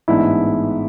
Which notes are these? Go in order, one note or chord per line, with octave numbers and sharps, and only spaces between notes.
A1 G#2 G#3 B3 D4 E4